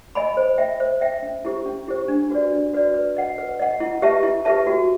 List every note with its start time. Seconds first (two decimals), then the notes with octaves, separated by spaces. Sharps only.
0.15 D#5 G#5 B5
0.37 C5
0.58 E5 G5
0.80 C5
1.01 E5 G5
1.22 C#4
1.45 E4 G4 C5
1.66 C#4
1.88 E4 G4 C5
2.08 D4
2.30 F#4 B4 D5
2.52 D4
2.73 F#4 B4 D5
2.94 B4
3.17 D#5 F#5
3.38 B4
3.60 D#5 F#5
3.80 E4
4.02 G4 B4 E5 A5
4.23 E4
4.45 G4 B4 E5 A5
4.67 F#4